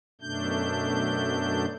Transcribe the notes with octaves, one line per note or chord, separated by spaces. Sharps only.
F#2 B2 A3 D4 G6